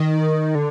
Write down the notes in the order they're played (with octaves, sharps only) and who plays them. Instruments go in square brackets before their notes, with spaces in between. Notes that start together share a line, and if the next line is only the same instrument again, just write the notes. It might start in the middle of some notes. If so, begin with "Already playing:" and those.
Already playing: [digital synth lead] D#3
D3